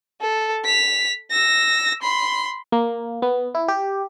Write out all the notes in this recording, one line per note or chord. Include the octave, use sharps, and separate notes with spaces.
A4
B6 F7
E6 A#6
B5 C6
A#3
B3
E4
G4